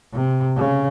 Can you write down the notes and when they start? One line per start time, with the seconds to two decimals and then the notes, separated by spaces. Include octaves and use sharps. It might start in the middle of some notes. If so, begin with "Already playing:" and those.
0.13 C3
0.57 C#3